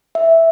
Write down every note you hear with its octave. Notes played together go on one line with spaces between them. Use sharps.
E5